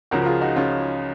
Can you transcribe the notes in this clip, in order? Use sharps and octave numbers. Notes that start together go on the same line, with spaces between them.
C#2 C#3 F3 F#4 A#4
A#4
F4 G#4
D#4 F#4
C#3 F3 C#4 F4